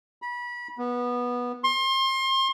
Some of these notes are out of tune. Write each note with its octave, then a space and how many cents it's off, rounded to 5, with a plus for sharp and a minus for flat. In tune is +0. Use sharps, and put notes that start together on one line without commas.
B5 -30
B3 -15
C6 +30